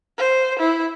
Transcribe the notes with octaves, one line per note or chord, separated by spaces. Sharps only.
C5
E4